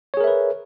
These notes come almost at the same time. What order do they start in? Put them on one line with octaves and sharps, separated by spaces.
C#5 G#4 A#4 E5 B4